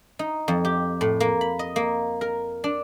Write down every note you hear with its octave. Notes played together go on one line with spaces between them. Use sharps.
D#4
F2
G4
A2
A#3
B5
D#5
A#3
A#4
D4